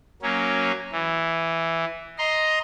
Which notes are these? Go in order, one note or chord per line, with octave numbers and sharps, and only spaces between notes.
F#3 A#3 C#4
E3
D#5 A#5 C6